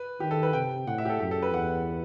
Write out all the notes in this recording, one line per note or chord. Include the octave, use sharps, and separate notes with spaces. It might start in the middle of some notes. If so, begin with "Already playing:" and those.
Already playing: B4
D#3 G4
A4
B4
C3 G5
A2 F#5
E5
G4
A4
F#2 G4
A4
B4
E2 F#5